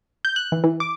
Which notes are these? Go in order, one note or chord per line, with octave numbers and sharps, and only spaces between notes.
G6
F#6
E3
E3
D6